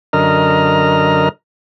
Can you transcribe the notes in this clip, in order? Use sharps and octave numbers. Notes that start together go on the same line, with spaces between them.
F#2 D3 A#4 D#5 A#5 F6